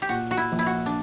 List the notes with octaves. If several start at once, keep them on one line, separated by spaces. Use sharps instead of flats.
G4
A#2 F#4
F#4
E4
A#1
E4
F#4
D4